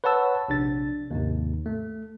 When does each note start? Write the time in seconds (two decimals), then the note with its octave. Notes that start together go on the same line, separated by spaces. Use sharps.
0.04 B4 C#5 F#5 A5 E6
0.48 A#1 C3 D4 A6
1.11 D#2 G#2 C3
1.66 A3